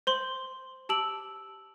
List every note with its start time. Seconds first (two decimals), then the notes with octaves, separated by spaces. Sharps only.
0.07 C5 C6 F#7
0.89 G4 A5 E6 D7 F#7